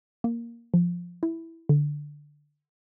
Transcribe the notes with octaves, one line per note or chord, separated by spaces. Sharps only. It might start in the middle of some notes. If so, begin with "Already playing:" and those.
A#3
F3
E4
D3